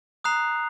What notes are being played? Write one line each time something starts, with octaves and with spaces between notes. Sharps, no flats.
A#5 D#6 F#6 C7 F7